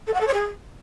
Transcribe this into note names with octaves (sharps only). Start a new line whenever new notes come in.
A4
F#5
A4
C#5
G#4